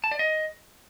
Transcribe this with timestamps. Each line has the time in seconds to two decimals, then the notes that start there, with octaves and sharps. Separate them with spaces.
0.04 A5
0.12 D5
0.19 D#5